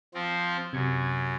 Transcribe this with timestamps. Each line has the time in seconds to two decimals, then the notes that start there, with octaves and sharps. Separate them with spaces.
0.14 F3 C4
0.73 F#2 C3 G#6 C#7